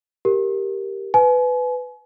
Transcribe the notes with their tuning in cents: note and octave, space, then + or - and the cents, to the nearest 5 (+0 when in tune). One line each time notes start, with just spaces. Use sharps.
G4 +0 A#4 +0
B4 +15 G#5 +40